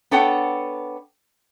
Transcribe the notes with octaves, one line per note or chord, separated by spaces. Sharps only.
B3 D4 A4 C#5 F#5 G5